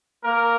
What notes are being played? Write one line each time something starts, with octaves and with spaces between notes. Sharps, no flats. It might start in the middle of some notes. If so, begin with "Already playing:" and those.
A#3 A#4